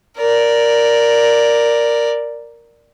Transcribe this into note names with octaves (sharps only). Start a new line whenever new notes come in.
A#4 D5